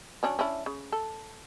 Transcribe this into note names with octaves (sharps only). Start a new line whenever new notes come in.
F#3 C#4 D4
C#4 D4 E4
C#3
A4